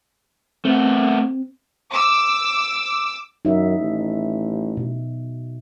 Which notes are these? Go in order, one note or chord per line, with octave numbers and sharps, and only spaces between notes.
A3 B3 C4
D6 E6
F#2 D#4 E5
A1
B2